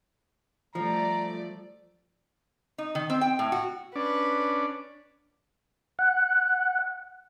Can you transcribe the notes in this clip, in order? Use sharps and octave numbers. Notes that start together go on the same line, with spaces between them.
F3 G3 A3 D5 A#5
D#4
D#3
C4
G5
A2
F#4
C#4 D4 B4 D5
F#5